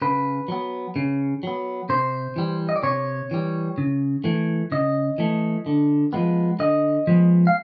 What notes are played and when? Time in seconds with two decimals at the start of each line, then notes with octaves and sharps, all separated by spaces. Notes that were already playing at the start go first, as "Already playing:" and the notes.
0.02 C#3 B4
0.48 F#3 B3
0.96 C#3
1.43 F#3 B3
1.89 C3 C5
2.36 E3 G3
2.69 D#5
2.76 D5
2.83 C3 C#5
3.31 E3 G3
3.78 C#3
4.24 E3 A3
4.72 C#3 D#5
5.18 E3 A3
5.66 D3
6.13 F3 G#3 B3
6.59 D3 D#5
7.07 F3 G#3 B3
7.47 F5